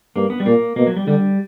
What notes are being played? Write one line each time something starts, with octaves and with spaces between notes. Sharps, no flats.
G2 A#3
B3
G3
A#2 A#3
B2 A#3
F#3
G3
D3 G3